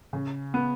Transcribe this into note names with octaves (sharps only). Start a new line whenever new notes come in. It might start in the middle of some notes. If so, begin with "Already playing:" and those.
C#3
B3